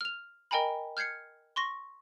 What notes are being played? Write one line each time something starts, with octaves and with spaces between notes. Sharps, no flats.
F6 F7
A#4 D#5 G5 G#5 A#5 B5
F6 G6 G#6 C7 C#7
C6 C#6 A#6